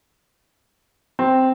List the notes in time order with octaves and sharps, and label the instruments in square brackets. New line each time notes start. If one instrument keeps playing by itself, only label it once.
[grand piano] C4